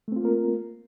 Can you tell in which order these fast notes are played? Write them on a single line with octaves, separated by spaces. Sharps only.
A3 C4 F4 A#3 A#4